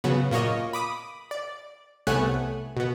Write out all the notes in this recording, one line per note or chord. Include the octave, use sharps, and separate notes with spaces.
C#3 F#3 B3
A#2 A#3 C#5 D#5
B5 D6 D#6
D5
C2 A3 B3 C#5 G#5 F#6
B2 B3